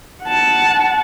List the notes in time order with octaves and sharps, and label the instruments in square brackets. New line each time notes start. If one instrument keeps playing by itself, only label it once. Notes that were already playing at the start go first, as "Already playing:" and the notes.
[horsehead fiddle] F#5 A5